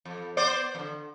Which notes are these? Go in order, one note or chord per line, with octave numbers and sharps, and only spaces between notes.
F2
B3 C5 D5
F2 D3